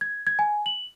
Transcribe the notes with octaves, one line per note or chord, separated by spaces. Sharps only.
G#6
G#6
G#5
F#7